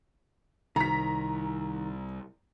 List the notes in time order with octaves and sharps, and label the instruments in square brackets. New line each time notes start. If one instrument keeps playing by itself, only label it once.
[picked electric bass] C2 [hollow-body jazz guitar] D#3 [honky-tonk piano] A#5 B6